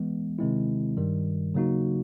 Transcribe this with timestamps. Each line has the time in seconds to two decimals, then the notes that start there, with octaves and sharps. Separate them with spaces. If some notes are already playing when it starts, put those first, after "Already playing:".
Already playing: E3 G#3 B3
0.39 C3 D#3 G#3 C4 E4
0.97 G2 D#3 G3
1.54 C#3 F#3 A#3 D#4 F#4